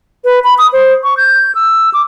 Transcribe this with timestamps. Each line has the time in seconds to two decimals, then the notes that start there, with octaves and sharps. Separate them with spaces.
0.25 B4
0.44 B5
0.58 D#6
0.73 C5
1.04 C#6
1.17 G6
1.55 E6
1.94 D6